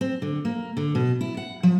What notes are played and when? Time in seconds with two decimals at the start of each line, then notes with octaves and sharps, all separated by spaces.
0.01 C4
0.22 D3
0.45 A#3
0.77 D3
0.95 B2
1.21 E4
1.37 F#5
1.63 F3